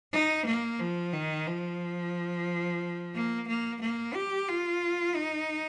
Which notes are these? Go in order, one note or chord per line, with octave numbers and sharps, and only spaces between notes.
D#4
A#3
F3
D#3
F3
A#3
A#3
A#3
G4
F4
D#4